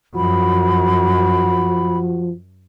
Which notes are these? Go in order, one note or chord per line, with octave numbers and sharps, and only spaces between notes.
F#2 F3 F#4 B5